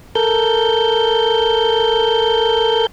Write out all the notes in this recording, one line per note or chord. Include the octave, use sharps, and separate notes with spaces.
A4 A#4 G6